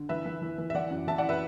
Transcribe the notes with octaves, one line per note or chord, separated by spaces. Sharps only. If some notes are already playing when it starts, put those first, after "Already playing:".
Already playing: D3
E3 B4 E5
E3
E3
E3
E5
E3 D5 F#5
F#2
E3 E5 A5
D5 F#5
B4 E5